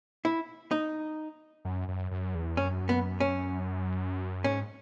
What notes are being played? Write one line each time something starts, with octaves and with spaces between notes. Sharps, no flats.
E4
D#4
F#2
F#2
F#2
E2
F#2 C#4
B3
C#4
G#2 C#4